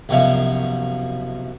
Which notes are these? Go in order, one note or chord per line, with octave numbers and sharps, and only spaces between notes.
C2 F#2 B2 F3 E5